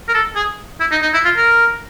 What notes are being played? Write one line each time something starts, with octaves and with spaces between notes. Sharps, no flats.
A#4
A4
G#4
E4
D#4
D#4
E4
F4
A#4